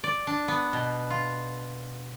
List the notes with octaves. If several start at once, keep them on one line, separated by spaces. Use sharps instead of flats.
D5
D4
B3
B2
F4